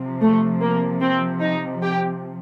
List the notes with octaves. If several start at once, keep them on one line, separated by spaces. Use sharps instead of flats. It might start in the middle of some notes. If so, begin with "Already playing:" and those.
Already playing: C3 F3
A3
A#3
C4
D#4
G4